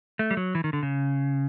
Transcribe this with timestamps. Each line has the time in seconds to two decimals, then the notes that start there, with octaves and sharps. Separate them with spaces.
0.19 A3
0.31 G3
0.37 F#3
0.55 E3
0.64 D#3
0.73 D3
0.83 C#3